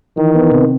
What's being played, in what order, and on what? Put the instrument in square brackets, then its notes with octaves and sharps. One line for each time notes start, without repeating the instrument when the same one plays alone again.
[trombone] D#3 [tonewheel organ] E3
[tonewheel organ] B3
C3